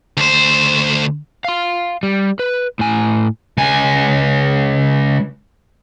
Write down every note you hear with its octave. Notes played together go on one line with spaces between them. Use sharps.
D2 C5
F5 C6
G3
B4
A2 G#5
C#2 G#5